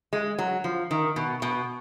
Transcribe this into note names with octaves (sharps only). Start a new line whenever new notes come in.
G#3
F#3
F3
D#3
B2
B2